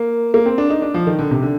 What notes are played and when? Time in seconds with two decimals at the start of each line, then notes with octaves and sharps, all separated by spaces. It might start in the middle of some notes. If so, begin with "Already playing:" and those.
Already playing: A#3
0.34 A#3
0.46 C4
0.58 D4
0.70 D#4
0.82 D4
0.94 F3
1.07 D#3
1.19 D3
1.31 C3
1.43 D3